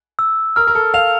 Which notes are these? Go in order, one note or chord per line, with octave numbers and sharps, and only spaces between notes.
E6
A#4 F6
A#4
A4
F5 F7